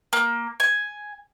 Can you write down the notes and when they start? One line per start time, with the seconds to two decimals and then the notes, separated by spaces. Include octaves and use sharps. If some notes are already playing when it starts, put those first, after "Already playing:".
0.13 A#3
0.60 G#5